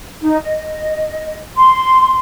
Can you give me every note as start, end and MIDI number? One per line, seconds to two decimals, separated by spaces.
0.22 0.36 63
0.42 1.36 75
1.57 2.19 84